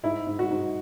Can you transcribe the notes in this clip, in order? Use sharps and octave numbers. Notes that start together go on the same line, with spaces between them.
G#2 E4
G#2
F#4
G#2